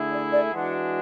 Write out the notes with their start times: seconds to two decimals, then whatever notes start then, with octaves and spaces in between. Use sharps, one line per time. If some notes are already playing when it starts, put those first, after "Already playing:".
Already playing: D3 A3 E4 G#4
0.13 D5
0.32 D5
0.52 E3 G#3 D4 F#4 F#5